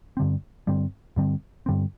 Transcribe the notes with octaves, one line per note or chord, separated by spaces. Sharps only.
G2 D3 G3 C4
G2 D3 G3 C4
G2 D3 G3 C4
G2 D3 G3 C4